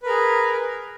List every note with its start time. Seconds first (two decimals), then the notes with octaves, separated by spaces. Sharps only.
0.03 B4
0.06 A#4
0.09 G#4